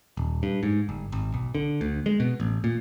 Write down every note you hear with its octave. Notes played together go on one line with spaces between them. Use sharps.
D#1
G2
G#2
G1
G#1
B1
D3
D2
G#3
B2
A1
A#2